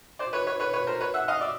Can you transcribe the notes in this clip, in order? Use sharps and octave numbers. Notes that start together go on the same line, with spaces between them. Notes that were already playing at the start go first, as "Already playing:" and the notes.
C5 D5
B4 C#5
B4 C#5
B4 C#5
B4 C#5
A#4 C5
B4 C#5
E5 F#5
D#5 F5
D5 E5